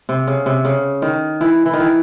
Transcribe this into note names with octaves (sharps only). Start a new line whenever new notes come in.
C3
C#3
C3
C#3
D#3
E3
E3
D#3
E3